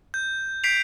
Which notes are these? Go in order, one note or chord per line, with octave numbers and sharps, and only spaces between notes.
G6
G6 B6 C7 D7 F7